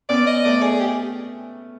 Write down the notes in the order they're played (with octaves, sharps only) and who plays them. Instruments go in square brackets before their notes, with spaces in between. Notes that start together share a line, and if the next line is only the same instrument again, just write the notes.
[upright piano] B3 C#4 [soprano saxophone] D5
[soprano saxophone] D#5
[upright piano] A3 B3 [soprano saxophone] D5
[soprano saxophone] G#4
G4